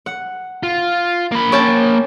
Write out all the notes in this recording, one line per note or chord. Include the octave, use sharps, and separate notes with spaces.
F#5
F4
A#3 B5
C#4 G5 A5